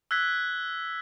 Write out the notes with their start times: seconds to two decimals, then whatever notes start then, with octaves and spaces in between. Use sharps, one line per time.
0.11 E6 F#6 G#6 B6